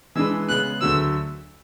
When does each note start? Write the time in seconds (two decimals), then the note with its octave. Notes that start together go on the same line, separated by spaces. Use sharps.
0.16 E3 G#3 D4 G#4 B4 E6
0.49 C#3 G#3 B3 F#6
0.81 D2 D3 F#3 A3 E6